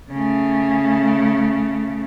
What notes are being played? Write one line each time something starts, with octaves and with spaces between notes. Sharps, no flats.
C#3 A3